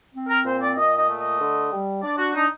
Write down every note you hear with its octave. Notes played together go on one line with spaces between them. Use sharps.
C4
A#4
A#2 C5
D5
A#2 D#5
D#5
A3
D#5
D3
G3
D4 D5
F#4
D4 D#4